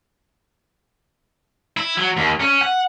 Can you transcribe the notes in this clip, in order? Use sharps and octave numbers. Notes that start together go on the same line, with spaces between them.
E4
F#3
D#2
C#4
F#5